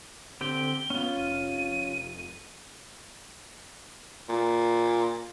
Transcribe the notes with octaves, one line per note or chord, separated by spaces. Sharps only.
D3 C4 G4 G5 G7
B3 C#4 F4
F1 D#7
A#2